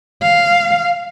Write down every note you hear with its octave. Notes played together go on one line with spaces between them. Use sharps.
F5